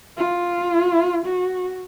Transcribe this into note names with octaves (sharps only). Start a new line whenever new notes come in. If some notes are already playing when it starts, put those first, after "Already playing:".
F4
F#4